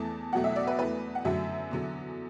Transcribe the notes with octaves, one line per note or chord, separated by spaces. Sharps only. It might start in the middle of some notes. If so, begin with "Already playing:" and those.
Already playing: E2 E3 A3 A5
E2 B2 F#3 A3 F#5
E5
D5
B4
E2 E3 A3 B4
F#5
F#2 D3 F#3 A3 E5
E2 D3 F#3